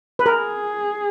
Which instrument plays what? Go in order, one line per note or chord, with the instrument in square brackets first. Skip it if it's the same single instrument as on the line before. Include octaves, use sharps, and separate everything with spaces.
[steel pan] B4
[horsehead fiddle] G#4 [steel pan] A#4